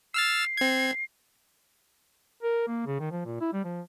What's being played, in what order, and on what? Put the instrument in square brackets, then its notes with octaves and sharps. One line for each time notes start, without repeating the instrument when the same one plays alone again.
[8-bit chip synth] E6 F6 A6 [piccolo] C7
[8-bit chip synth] C4 G#6
[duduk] A#4
A#3
C#3
D#3
F3
A#2
E4
G3
F3